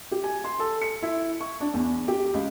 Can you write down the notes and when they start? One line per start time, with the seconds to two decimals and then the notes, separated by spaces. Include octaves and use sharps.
0.11 G4
0.24 G#5
0.44 C6
0.59 A4
0.82 C#7
1.02 E4
1.41 C#6
1.61 D4
1.74 E2
2.08 G4
2.34 C#2